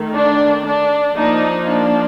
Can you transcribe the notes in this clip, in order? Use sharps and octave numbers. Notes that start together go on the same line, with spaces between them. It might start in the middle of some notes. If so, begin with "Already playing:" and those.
Already playing: D#3 A3
D4
D4
F3 A#3 D4 D#4
D4